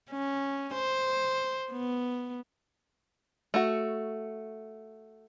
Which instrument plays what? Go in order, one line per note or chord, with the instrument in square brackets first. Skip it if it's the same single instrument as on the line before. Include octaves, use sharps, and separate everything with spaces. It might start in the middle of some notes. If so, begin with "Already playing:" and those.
[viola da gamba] C#4
C5
B3
[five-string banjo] A3 F#4